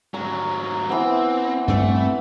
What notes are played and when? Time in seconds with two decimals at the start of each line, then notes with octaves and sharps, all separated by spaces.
0.14 G#2 F#3 A#5
0.89 E3 B3 C4
1.68 G2 A3 C4